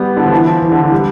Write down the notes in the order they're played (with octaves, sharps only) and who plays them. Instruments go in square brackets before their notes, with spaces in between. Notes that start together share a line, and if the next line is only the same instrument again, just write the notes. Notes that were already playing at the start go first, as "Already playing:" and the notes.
Already playing: [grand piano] G3 B3
D3
F3
E3
F3
E3
D3
E3
G3